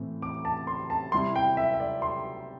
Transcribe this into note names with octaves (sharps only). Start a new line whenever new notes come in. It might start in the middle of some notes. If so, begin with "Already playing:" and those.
Already playing: A2 E3 C4
D6
A5
C6
A5
C3 G3 E4 C6
G5
E5
E5
D5
C6